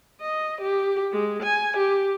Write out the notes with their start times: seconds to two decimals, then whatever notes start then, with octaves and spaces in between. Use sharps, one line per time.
0.20 D#5
0.61 G4
1.12 G#3
1.43 G#5
1.77 G4